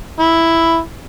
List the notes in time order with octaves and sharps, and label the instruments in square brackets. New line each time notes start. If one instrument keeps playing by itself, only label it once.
[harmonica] E4